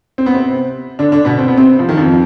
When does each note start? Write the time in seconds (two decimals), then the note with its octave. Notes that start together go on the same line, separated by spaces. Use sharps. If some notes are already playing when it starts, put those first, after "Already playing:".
0.18 C4
0.26 B3
0.34 C3 C4
0.99 D3 D4
1.12 D3 D4
1.25 B2 B3
1.38 C4
1.48 B3
1.57 C3 C4
1.79 F3
1.89 D#3
1.97 F2 F3